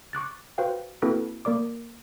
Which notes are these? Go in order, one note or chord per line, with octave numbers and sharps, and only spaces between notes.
C#6 D6 F#6 A6
F#4 B4 C5 F5 G5
A#3 C4 E4 F#4 A4 B4
A#3 A#4 D5 D6